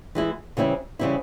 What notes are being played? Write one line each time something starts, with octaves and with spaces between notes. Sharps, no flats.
E3 G#3 E4
C#3 E3 G3 C4 E4
C#3 E3 G3 C4 E4